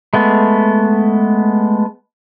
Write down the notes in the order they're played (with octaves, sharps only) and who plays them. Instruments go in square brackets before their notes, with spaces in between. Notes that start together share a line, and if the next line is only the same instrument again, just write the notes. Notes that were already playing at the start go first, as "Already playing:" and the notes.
[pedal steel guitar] G#3 A3 B3